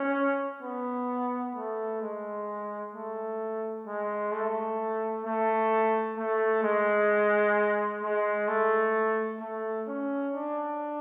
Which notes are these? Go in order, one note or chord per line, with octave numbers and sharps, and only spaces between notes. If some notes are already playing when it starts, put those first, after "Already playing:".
Already playing: C#4
B3
A3
G#3
A3
G#3
A3
A3
A3
G#3
G#3
A3
A3
C#4
D4